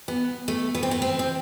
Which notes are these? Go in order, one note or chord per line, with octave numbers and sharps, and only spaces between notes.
B3
A3
B3
C4
B3
C4
C4